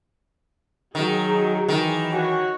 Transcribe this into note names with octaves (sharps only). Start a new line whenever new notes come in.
D#3 F#3 G#4
D#4
D#3 E3
F#4 C#5